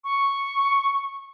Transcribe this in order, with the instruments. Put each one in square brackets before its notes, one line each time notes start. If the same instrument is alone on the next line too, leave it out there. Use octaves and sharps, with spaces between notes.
[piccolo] C#6